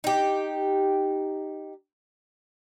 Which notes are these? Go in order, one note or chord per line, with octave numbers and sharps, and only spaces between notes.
D#4 G4